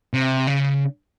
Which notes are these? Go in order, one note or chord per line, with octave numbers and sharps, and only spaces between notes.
C3
C#3